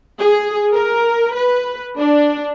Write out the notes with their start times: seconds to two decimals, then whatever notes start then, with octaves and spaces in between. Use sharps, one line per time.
0.19 G#4
0.72 A#4
1.35 B4
1.98 D4